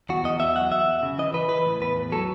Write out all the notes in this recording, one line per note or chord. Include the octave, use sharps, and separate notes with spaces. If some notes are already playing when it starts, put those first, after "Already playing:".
E2 F#4
E2 D#5
E2 E5
F#3 F#5
E2 E5
E2
C#3
E3 D#5
E3 B4
E3 B4
A2
E2 B4
E2
F#3 A4